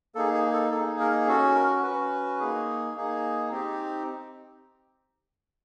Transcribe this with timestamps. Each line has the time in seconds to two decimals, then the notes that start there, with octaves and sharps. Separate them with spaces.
0.15 A#3 D#4 G#4 A4
0.34 G#4
0.53 A4
0.71 A#3 D#4 G#4 A4
0.99 A#4
1.27 C#4 F#4 A4
1.55 A#4
1.83 C#4 F#4 B4
2.39 A#3 D#4 G#4
2.94 A#3 D#4 G#4
3.51 C4 D#4 G4